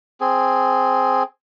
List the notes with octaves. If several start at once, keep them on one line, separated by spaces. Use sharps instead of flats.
C4 G#4